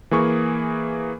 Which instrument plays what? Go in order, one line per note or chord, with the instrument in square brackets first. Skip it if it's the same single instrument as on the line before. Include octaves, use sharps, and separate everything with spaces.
[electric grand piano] E3 A#3 G#4 C#6